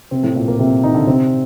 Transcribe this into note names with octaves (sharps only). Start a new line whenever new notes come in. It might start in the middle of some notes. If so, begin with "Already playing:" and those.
C3 C4
A2 A3
A#2 A#3
A#2 A#3
C3 C4
D#3 D#4
D3 D4
C3 C4